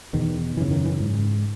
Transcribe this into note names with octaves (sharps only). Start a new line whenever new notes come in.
E2 B2 D#3
F#2 C#3 E3
D#3
E3
G#2